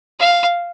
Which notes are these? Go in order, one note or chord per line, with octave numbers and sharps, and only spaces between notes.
F5